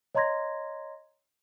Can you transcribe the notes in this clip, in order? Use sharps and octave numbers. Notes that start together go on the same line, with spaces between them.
C#5 D#5 A#5 C6 G#6 A#6